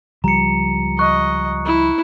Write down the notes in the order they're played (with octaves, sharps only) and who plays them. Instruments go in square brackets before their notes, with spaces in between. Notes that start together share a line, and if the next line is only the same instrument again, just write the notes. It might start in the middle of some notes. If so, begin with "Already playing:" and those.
[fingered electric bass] C#2 F3 G3 [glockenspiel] A#5 C#7
[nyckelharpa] D#5 [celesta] C#6 [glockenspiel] F#6
[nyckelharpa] E4